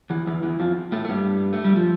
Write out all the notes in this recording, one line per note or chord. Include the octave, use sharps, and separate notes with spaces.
E2 E3
E2 E3
E2 E3
F2 F3
A2 A3
A3
G2 G3
A3
G3
F3